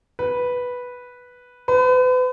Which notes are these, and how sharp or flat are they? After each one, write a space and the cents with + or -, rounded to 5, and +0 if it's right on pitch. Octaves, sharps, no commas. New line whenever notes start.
B4 -5
B4 +40